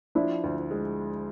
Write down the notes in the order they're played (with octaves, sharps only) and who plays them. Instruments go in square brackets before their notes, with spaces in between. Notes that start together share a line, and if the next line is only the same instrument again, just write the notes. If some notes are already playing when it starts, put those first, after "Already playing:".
[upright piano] F3 [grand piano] D4 E4
[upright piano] D2
G#3